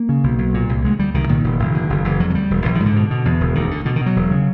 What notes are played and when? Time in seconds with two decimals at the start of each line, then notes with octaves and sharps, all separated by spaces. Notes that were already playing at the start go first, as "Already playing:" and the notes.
Already playing: A#3
0.09 C#3
0.24 B1
0.39 B1
0.54 A#2
0.69 C2
0.84 D2 G#3
0.99 D2 G3
1.14 C2 D#3
1.29 A#2 D#3
1.44 F1
1.59 F1
1.75 D3
1.90 F#1
2.05 F#1 E3
2.20 F2 F#3
2.30 F#3
2.34 D2 G3
2.51 E1
2.65 A#1 E3
2.75 D#3
2.80 G#2
2.86 D3
2.96 B2
3.11 B2
3.25 E2
3.41 E1
3.55 D2 D#3
3.71 D3
3.85 B2 D3
3.96 D#3
4.01 B2
4.06 F#3
4.16 E1
4.31 C#3